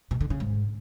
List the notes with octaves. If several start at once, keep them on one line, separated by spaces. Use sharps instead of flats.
B2
D3
C#3
G#2